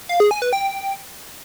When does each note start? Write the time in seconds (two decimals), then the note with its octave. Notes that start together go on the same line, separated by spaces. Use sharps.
0.09 F5
0.20 G#4
0.31 G#5
0.42 B4
0.53 G5